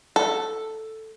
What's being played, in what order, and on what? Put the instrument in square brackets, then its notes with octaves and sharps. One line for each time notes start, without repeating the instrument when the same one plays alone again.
[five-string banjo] A4